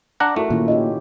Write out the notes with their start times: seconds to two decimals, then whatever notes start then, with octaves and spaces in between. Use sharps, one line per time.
0.20 D4 F#5 A#5
0.36 A3 E4 F#4 A#4
0.50 A#2 D#3 C#4 E4
0.68 C#4 F4 G4 D#5